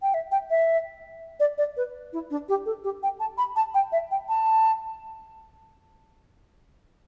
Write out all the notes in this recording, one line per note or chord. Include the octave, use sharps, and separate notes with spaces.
G5
E5
G5
E5
D5
D5
B4
E4
D4
G4
A4
G4
G5
A5
B5
A5
G5
E5
G5
A5